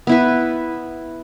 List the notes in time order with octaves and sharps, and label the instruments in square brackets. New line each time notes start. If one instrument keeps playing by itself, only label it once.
[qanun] B3 E4 B4